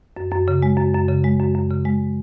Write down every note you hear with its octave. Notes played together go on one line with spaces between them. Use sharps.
F#2
F#2
C#3
G#3
F#2
F#2
C#3
G#3
F#2
F#2
C#3
G#3